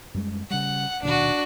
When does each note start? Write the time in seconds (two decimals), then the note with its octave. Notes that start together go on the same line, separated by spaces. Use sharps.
0.14 F#2 G3 G#3
0.50 C#3 G3 F#5
1.03 D#1 B2 D#3 D4 F#4